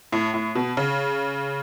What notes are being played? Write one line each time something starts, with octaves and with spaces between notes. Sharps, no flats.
A2
A2
B2
C#3